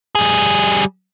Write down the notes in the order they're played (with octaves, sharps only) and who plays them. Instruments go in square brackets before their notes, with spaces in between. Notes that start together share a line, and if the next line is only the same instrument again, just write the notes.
[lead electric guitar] G3 G#4